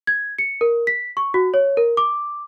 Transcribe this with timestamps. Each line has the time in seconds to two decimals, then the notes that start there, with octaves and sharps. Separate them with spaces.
0.07 G#6
0.38 C#7
0.61 A#4
0.87 B6
1.17 C#6
1.34 F#4
1.54 C#5
1.77 A#4
1.97 D6